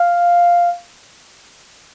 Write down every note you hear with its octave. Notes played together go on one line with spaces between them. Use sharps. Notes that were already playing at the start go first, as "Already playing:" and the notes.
Already playing: F5